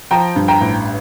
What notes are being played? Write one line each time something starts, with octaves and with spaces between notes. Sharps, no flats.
F3 G5 A#5
G2
G5 A#5
A1